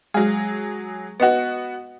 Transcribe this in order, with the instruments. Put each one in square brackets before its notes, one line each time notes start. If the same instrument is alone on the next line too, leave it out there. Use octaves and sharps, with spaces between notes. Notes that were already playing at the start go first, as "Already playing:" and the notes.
[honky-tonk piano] F#3 G#4 [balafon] G#3
[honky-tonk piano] B3 F#4 [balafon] B4 D#5 F#5